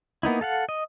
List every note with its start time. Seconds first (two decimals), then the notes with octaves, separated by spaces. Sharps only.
0.23 A#3 B3 D#4 E4
0.41 A4 F5 F#5
0.69 D#5